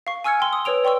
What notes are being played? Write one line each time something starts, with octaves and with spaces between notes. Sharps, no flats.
F5 C#6
G#5 C#6 E6 F6 G#6 C#7
G5 C6 E6
D#6
B4 C#5 E6 D7 F7
D5 G5 C6 C#6 E6